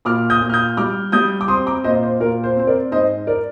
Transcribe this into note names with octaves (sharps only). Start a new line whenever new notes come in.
A#2 D6 F6
D#6 G6
A#2
F6
D#6 G6
G3 D6 F6
G3 D#6 G6
D6
C4 C6 D#6
A#5 D6
A#2 C5 D#5
C5
A#2 A#4
C5
C4 C5
A#4 D5
G#2 C5 D#5
A#4 D5